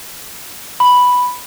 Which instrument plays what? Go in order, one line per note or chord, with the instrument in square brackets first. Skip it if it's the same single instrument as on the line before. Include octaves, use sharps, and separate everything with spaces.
[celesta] B5